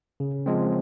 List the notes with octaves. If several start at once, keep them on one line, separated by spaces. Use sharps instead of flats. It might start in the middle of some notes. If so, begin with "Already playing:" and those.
C#3
F3 G#3 C4